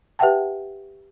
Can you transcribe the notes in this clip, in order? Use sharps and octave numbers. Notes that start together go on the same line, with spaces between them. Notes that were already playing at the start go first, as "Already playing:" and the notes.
G4 B4 E5 F#5 G5 A5